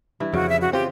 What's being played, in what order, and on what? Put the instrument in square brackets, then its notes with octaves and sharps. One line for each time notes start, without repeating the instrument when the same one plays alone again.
[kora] G2 E3 E4
[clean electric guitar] F2 [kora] C#3 [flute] F#4
[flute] E5
F#4
[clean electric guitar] C4 F4 [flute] G4